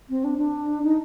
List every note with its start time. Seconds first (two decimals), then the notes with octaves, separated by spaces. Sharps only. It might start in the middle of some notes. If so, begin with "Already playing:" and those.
0.09 C4
0.23 D4
0.38 D4
0.83 D#4